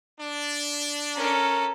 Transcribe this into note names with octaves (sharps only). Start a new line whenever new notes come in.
D4
C#4 A4 A#4